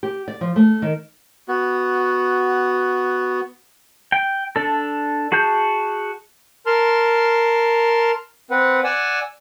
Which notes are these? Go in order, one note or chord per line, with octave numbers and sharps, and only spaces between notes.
G4
D5
F3
A3
D#3
B3 F#4
G5
D4 A4
F#4 G#4 A5 G6
A#4 A5 C6 F6
C4 B4 F#5
D5 F#5 G#5 E6